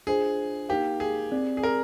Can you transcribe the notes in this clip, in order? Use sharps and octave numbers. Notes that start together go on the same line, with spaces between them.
D4 F4 G#4 C5 D#5
A#3 D#4 G4 A#4 F5
G#4
C4 G4 D5
G#4
A#4